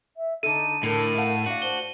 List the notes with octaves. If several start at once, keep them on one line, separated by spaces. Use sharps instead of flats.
E5
D3 D#4 A4 D#7
A2 D3 A#4
A3 F5 F#5
D4 F#4 F5
C5 G7